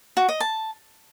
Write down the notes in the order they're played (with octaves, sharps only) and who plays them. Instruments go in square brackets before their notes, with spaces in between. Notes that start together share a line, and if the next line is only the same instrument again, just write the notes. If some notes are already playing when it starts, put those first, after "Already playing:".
[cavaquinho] F#4
D#5
A5